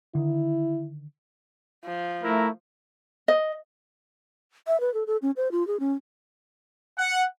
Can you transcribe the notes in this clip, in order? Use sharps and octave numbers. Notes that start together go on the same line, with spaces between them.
D3 D#3 E4
F3
A3 E4 A#4 A#5
D#5
E5
B4
A4
A4
C#4
C5
F4
G#4
C#4
F#5